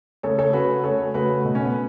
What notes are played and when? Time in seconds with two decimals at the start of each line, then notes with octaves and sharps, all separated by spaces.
0.23 C#3 A3 A4 C#5
0.39 A4 C#5
0.53 C#3 A3 F#4 B4
0.84 C#3 A3 A4 C#5
1.14 C#3 A3 F#4 B4
1.45 B2 A3
1.55 C#4
1.65 B3